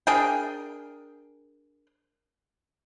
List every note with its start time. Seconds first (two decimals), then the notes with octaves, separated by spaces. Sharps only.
0.07 D4 G#4 A#4 G5